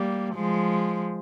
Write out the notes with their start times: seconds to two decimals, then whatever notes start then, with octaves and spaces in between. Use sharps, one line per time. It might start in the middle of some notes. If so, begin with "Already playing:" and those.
Already playing: G3 A#3
0.35 F3 G#3